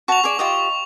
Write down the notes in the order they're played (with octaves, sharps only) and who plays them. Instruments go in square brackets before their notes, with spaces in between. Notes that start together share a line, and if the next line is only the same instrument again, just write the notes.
[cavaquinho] F#4 A5 [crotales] C#6 F7
[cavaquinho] G#4 D5
F4 G4 D#5